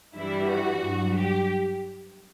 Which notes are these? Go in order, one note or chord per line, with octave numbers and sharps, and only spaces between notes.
G2 E3 G3 E4
F#4
G2 F#3
G4